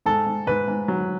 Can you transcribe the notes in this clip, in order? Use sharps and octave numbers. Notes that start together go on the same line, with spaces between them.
G#2 A4
G#2
G#2 B4
G#2
F#3